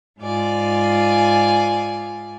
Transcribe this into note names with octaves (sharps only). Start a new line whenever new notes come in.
G#2 F4 D5 G#5